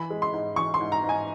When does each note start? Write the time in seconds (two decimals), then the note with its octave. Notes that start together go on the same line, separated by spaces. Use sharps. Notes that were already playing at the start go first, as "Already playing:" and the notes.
Already playing: E3 B5
0.10 G#3
0.22 C6
0.33 G#2
0.56 E3 C#6
0.74 C6
0.81 G#2
0.92 A#5
1.03 G#2
1.09 G#5